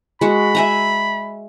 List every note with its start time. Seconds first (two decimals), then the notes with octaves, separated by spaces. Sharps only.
0.21 G#3 F#4 B5
0.55 E5 G#5 A#5